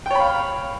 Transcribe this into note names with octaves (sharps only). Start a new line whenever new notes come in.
C#5 F5 G5 B5